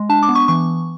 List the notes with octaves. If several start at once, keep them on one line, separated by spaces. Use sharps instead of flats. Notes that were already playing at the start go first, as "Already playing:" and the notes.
Already playing: G#3
D4 A5
D6
B3
C#6
E3 C#6